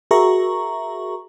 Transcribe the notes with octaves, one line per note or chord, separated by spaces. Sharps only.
F#4 G#4 A#4 E5 A#5 C#6